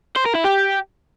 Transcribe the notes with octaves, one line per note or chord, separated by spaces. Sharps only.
C5
A#4
E4
G4